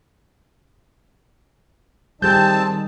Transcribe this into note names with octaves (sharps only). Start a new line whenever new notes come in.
D#3 G3 C4 G#4 A5 G6